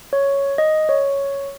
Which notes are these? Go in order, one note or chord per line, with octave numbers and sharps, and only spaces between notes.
C#5
D#5
C#5